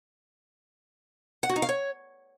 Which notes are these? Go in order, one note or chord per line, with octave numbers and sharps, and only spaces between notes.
F#5
F#4
D#4
F5
C#5